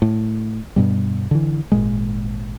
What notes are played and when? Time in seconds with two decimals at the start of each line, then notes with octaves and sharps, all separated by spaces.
0.02 A2
0.76 G2 B2 G3
1.31 D3 E3
1.72 G#1 A#2 G#3